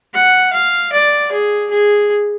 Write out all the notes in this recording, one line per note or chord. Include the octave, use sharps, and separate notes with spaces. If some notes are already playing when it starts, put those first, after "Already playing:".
F#5
F5
D5
G#4
G#4